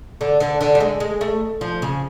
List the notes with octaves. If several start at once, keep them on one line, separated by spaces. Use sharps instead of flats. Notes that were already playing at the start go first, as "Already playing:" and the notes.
D3
D3
D3
G3
G#3
G#3
A3
F3
C#3